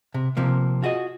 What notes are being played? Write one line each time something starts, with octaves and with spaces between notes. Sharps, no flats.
C3
C3 F3 A#3
F4 F#4 G#4 D#5